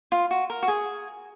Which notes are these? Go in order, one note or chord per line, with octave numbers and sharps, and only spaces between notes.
F4
F#4
A#4
F#4
G#4